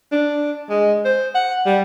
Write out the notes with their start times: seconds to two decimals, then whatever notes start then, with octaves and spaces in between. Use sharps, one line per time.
0.12 D4
0.70 G#3
1.05 C5
1.35 F#5
1.66 G3